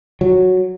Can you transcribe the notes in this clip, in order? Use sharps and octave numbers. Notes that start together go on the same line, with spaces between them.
F#3